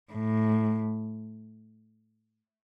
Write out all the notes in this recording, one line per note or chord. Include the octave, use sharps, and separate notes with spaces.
A2